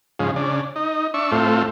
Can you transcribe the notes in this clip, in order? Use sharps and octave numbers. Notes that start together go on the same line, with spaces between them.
G#2 C#3 F3
C#3 D4
D#4
D4 E5 C#6
A2 A3 C4 F4